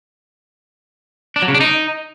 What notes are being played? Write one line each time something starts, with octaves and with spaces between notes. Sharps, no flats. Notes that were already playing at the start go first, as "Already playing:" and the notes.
D4
F#3
C#3
D4
D#4